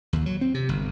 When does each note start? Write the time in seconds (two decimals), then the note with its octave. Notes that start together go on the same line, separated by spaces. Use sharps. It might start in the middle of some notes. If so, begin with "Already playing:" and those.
0.13 D#2
0.26 F#3
0.41 C4
0.54 C3
0.69 G1